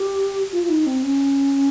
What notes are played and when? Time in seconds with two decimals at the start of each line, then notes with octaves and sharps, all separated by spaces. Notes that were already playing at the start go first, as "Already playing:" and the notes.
Already playing: G4
0.52 F4
0.63 F4
0.69 D#4
0.86 C4
1.03 C#4